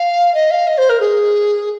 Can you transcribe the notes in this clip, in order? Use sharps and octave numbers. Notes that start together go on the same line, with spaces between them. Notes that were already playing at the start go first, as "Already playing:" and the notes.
Already playing: F5
D#5
F5
D#5
C5
A#4
G#4